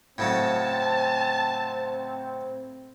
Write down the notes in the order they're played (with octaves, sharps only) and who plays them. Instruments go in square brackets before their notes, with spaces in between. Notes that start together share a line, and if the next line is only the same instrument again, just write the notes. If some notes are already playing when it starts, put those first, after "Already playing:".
[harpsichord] A2 C#3 F#3 [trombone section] C4 [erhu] A5